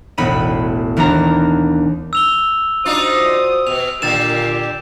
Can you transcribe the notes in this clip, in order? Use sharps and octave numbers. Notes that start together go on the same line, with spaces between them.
E1 A1 B3 B5 D#7
D#2 E3 B3 D4 A#5
E6 F7 G7
F3 D4 D#4 F4 F#4 C5 D#6
B2 F7
A#2 D3 G4 A6 E7